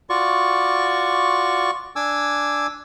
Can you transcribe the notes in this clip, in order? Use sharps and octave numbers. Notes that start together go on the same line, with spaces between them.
F4 F#4 D5 C#6
D4 G#5 D6 E6